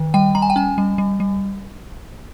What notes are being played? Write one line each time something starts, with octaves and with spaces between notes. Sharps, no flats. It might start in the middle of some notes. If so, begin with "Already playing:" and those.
Already playing: D#3
G3 G5
G3 A#5
G#5
G5
C#4 G#5
G3
G3
G3